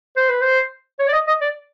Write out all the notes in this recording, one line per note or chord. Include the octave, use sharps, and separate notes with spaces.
C5
B4
C5
C#5
D5
D#5
D#5
D5